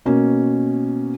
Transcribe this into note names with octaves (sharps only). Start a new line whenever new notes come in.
B2 A#3 C#4